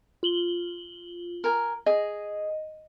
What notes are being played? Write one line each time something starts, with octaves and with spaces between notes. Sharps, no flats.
F4 F#7 G7
A#4 G#5
G#4 D#5